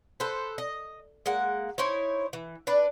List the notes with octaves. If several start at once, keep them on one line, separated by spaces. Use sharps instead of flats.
A4 B4 C5
D#5
G#3 A#3 F#5
D#4 E4 C5 C#5
E3
D4 B4 D5